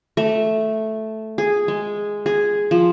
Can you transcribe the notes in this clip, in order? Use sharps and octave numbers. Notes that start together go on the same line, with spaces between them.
A3
G#4
G#3
G#4
F3